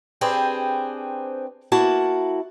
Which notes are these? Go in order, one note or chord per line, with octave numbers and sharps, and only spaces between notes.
C4 D4 G4 G#4 B4 C5
A#3 E4 F#4 A5